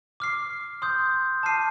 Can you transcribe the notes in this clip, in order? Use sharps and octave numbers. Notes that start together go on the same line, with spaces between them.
D6 F6 C7
C6 D#6 G6
A5 D6 F6 C7 D#7